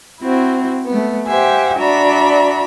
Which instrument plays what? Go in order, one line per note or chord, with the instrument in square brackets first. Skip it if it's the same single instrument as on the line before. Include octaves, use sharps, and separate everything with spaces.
[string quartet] C4 E4 F#4 C5
A3 B3
G4 C5 E5 F#5 G#5
D4 F#4 D5 E5 A#5 B5